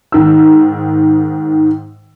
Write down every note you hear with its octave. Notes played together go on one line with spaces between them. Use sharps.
G#2 D#3 E6